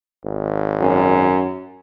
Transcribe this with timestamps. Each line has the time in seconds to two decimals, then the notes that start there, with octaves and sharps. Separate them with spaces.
0.25 G#1
0.81 F#2